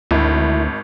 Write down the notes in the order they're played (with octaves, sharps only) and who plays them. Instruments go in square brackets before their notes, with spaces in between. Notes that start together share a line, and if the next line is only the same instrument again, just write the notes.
[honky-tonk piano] G#1 [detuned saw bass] D2 [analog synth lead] E4